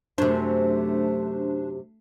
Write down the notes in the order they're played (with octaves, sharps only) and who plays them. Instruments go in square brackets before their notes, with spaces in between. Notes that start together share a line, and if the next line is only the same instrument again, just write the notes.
[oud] F#2 C3 [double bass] A3 [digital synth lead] D4 [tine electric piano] C5